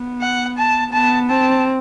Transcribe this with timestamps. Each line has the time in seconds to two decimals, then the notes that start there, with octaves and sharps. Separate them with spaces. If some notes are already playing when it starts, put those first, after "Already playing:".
Already playing: B3
0.21 F#5
0.58 A5
0.93 B3 A5
1.30 C4 A5